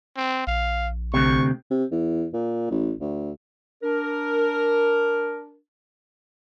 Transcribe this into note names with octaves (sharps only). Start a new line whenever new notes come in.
C4
A#1 F5
D2 C3 C#6
C3
E2
A#2
A1
D2
D4 A#4